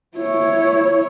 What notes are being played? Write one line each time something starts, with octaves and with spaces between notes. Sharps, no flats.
E4 C#5